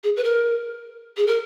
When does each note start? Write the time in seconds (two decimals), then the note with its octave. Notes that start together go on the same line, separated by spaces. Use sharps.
0.04 G#4
0.16 B4
0.24 A#4
1.17 G#4
1.27 A#4